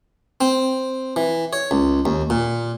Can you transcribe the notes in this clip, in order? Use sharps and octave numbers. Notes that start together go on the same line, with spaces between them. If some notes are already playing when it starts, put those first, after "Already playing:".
C4
E3
C#5
C#2
D#2
A#2